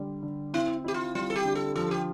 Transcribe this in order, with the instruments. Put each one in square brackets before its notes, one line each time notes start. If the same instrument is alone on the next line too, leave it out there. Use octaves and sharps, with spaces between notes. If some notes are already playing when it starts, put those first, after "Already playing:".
Already playing: [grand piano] D3 G3
D3
[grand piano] C4 [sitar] E4
[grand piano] E4 [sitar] G4
[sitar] F4
[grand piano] G3 [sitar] F4
[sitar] A4
G4
[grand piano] D3
[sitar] A4
[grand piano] F3 [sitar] A4
[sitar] G4